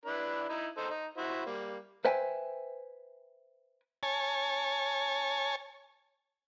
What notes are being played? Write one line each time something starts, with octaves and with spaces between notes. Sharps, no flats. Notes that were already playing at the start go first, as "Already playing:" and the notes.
D4 E4 B4
D#4 E4
D#4 A4 C5
D#4
E4 F#4 C5
G3 A#3
B4 C5 E5 G5 G#5
C#5 G#5 A5